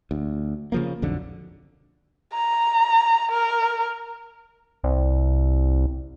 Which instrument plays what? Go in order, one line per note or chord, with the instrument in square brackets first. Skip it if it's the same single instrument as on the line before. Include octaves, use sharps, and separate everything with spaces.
[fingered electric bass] D2
C#3 F3 A#3
B1 F2 D3
[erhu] A#5
A#4
[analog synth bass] C2